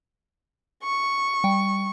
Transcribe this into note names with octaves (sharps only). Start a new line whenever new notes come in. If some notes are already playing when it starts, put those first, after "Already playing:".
C#6
G3 G5